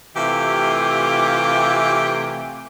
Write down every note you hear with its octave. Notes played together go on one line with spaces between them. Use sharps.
C3 E3 A3 F4 G4